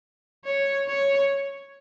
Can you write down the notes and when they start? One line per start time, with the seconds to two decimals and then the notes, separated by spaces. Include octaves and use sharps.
0.45 C#5
0.88 C#5